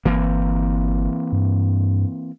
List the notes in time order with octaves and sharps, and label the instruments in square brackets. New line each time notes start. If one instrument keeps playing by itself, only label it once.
[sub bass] G1 [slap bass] E3 A#3 C4
[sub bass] G2